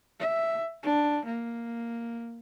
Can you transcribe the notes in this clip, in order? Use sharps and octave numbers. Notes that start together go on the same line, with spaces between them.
E5
D4
A#3